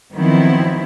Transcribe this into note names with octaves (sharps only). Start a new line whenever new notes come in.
D#3 F3 F#3 B3 C4 E4